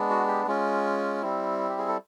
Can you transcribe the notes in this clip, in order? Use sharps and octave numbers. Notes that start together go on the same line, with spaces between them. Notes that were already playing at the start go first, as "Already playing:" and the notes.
Already playing: G#3 B3 D4
F#4
G4
G#3 C#4 F4
G3 C4 E4
G4
G#4
A4